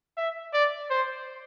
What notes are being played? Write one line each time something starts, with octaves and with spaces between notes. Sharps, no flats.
E5
D5
C5